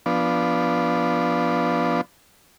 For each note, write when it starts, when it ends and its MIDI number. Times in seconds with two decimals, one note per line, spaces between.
0.06 2.01 53
0.06 2.01 59
0.06 2.01 62